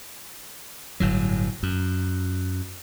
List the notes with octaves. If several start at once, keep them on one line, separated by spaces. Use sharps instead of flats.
G1 A2 F#3
F#2